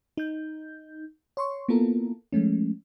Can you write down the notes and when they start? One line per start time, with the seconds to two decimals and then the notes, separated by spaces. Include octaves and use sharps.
0.17 D#4 G6
1.37 C#5 C6 C#6
1.68 A#3 B3 E4 F4 A4 A#4
2.33 F3 G#3 A3 C#4